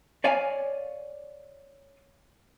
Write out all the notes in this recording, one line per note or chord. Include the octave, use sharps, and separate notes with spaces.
C#5 D5 F5 G#5